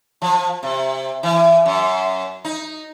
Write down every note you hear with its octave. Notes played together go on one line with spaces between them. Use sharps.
F3
C3
E3
F#2
D#4